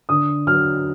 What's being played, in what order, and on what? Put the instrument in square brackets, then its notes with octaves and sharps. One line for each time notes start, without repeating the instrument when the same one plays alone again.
[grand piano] D3 D#6
F#3 F6